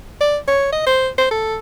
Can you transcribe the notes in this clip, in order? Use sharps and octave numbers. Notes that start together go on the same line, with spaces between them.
D5
C#5
D#5
C5
C5
A4